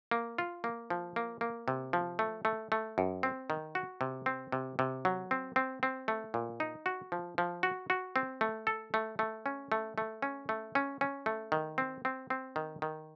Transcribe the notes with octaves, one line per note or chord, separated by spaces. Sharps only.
A#3
F4
A#3
F3
A#3
A#3
C3
F3
A3
A3
A3
F#2
C4
D#3
F#4
C3
C4
C3
C3
F#3
C4
C4
C4
A3
A#2
D#4
F#4
F3
F3
F#4
F#4
C4
A3
A4
A3
A3
C#4
A3
A3
C#4
A3
C#4
C#4
A3
D#3
C4
C4
C4
D#3
D#3